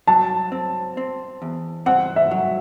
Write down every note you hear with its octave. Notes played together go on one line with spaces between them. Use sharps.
F#3 A5
C4
C4
E2
C4 F#5
E5
F#3